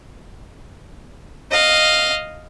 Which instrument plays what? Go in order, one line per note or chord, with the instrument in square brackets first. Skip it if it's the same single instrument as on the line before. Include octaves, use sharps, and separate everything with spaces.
[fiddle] D#5 F5